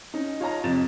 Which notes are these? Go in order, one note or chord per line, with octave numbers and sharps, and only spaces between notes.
C#4 D#4
F4 C#5 D#5 A5 A#5
F2 C3 F3 A5 A6 E7